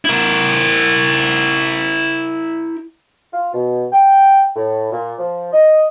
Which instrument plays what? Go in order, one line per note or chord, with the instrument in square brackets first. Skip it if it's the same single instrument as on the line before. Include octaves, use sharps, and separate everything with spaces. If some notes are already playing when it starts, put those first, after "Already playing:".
[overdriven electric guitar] E4 A#4
[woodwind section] F4
B2
G5
A2
A#2
F3
D#5